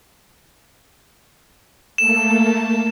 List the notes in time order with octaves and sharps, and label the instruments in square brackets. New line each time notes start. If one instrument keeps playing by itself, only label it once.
[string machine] A3 A#3 A4 [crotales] E7